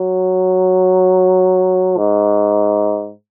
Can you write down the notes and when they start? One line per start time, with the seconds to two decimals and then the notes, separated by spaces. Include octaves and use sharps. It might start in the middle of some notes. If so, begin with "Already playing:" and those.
Already playing: F#3
1.97 G#2